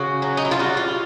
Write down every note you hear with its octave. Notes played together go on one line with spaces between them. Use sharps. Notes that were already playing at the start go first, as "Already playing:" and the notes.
Already playing: C#3 F#4
F#3
D#4
E4
F4
G3 F#4
F4